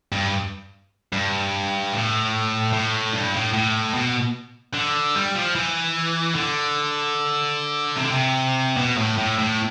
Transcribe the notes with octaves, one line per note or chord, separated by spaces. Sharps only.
G2
G2
A2
A2
G2
A2
A2
B2
D3
G3
F3
E3
D3
C3
D3
C3
B2
A2
A2
A2